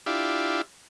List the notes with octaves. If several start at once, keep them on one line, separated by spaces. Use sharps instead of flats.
D4 E4 F4 G4